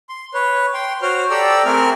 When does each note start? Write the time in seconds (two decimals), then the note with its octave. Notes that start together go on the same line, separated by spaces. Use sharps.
0.09 C6
0.34 B4 C#5
0.74 G5 C6
1.02 F#4 C5 C#5 F6
1.30 G4 A4 D5 G5 A#5 E6
1.65 A3 C4 G#4 A#4 F6